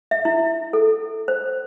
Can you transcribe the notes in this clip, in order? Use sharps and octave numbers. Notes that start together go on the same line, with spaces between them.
E5
E4
A4
C5